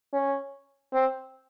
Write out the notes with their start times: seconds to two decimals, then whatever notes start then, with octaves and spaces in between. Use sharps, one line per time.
0.13 C#4
0.93 C4